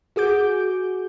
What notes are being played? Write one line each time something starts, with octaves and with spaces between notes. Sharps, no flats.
F#4 G#4 D6 G6